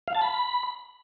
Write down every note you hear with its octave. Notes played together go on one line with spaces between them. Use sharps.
F5
A5
B5